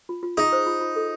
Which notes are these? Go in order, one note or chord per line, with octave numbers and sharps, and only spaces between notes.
F4
F4
D#4 G#4
C5
F4
F4
A4